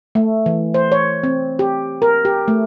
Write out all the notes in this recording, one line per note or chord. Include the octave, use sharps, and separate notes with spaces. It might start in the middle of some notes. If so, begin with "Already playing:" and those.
A3
E3
C5
C#5
C4
G4
A#4
G4
A3